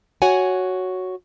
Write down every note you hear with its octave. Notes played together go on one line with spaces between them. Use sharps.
F#4 C#5 F#5 G#5